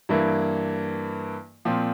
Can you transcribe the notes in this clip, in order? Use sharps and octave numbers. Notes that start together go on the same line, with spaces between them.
G2 E3 A#3 E4
A#2 F3 C4